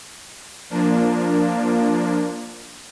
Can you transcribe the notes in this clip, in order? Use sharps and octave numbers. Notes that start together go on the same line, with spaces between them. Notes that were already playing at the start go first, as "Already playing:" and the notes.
F3 A#3 D4